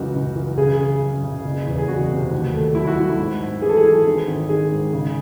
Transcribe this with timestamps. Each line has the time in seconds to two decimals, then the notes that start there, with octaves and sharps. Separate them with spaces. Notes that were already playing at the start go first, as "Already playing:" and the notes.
Already playing: C#2 F#2 E3 F#4
0.15 C#2
0.36 E3
0.57 C#3 G#4
0.79 C#3
1.01 F#2
1.24 C#3
1.45 F#1
1.67 E2
1.78 G#4
1.88 F#1 F#4
2.11 C3
2.32 D#2
2.54 A3
2.75 F#3 E4
2.87 F#4
2.98 F#3 E4
3.19 G#2
3.41 G#2
3.62 E3 G#4
3.69 A4
3.77 G#4
3.84 E3
4.07 G#1
4.27 G#1
4.49 D#3 G#4
4.71 G#2
4.93 C#3